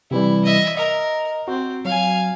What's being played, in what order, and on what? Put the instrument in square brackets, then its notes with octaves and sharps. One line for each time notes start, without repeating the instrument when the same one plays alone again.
[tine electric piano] C3 E3 G3 [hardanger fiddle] E4
[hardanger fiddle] D#5 E5
[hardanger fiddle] A#4 [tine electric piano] D#5
[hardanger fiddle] C4 [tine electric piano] F#4
[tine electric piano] F#3 [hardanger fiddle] F5 G#5